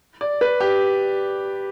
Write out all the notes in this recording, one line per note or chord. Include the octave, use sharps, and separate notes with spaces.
D5
B4
G4